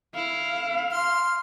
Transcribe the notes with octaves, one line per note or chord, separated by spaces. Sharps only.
E4 F5
C6 F6